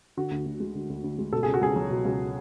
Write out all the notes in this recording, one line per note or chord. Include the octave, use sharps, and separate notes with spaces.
D3 F#4
D2
D2
G#3
D3
D2
D2
G#3
B2 A4
C#2 G#4
F#4
C#2 G#4
F#3
B2
C#2